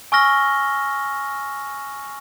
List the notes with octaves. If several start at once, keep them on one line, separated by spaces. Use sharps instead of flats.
G#5 C#6 E6 F6 A#6 G7